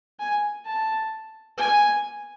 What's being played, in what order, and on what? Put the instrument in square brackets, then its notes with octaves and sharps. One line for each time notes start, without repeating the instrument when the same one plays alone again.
[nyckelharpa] G#5
A5
G#5